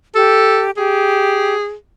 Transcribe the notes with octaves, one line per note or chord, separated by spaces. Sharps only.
G4 A4
G4 G#4